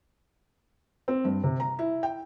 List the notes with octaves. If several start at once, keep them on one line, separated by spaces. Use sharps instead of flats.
C4
G2
C3
A#5
E4
G5